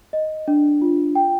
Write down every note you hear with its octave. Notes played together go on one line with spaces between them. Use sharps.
D#5
D4
F4
G5